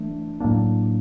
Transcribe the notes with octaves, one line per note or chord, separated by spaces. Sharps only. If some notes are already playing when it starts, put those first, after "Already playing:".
Already playing: E3 A3 D4
A2 F#3 A#3 D4